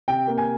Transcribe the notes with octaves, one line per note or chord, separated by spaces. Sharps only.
C3 G5
A#3
G#5